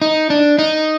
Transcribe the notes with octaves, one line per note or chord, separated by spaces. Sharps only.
D#4
D4
D#4